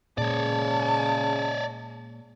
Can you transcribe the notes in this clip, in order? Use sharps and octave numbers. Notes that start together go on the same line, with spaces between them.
A#2 C#3 G#3 C#5 D5 A5